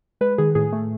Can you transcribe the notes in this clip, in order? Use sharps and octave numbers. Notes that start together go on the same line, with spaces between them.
G#3 B4
D#3 G#4
A2 G#4
A3